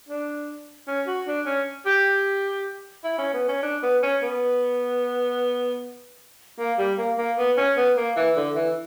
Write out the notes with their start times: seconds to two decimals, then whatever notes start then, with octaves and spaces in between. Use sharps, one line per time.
0.09 D4
0.88 C#4
1.07 F#4
1.27 D4
1.47 C#4
1.86 G4
3.04 E4
3.19 C#4
3.34 B3
3.49 C#4
3.63 D4
3.83 B3
4.03 C#4
4.23 B3
6.59 A#3
6.79 G3
6.98 A#3
7.18 A#3
7.38 B3
7.58 C#4
7.77 B3
7.97 A#3
8.17 E3
8.37 D3
8.56 E3